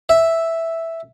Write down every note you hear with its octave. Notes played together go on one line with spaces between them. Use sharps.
E5